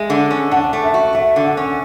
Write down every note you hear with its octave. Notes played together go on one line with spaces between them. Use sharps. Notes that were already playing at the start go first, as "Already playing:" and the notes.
Already playing: G#3 E5
D3
C#4
D4 F#5
A3
E5
F#4
A3 E5
D3
F#5
C#4